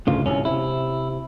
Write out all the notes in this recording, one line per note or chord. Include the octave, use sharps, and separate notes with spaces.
D2 G#2 C#3 F4
C2 G#2 C3 C#4
C3 E4